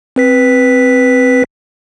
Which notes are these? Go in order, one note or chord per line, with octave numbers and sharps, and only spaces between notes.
C4 B4 B6